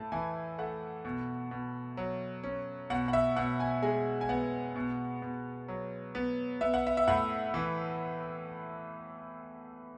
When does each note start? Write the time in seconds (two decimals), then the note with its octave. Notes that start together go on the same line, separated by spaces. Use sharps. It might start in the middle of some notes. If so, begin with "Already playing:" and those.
Already playing: A2 A5
0.12 E3 G#5
0.58 A3 F#5
1.05 B2
1.51 B2
1.97 F#3
2.44 C#4
2.90 B2 F#5
3.08 F#5
3.13 E5
3.36 B2 F#5
3.60 G#5
3.82 G#3 G#5
4.21 G#5
4.29 B3 F#5
4.76 B2
5.22 B2
5.68 F#3
6.15 B3
6.61 B3 E5
6.74 F#5
6.87 E5
6.97 E5
7.07 A2 F#5
7.54 E3